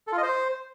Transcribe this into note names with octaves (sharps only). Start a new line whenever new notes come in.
A4
F4
D#5
C5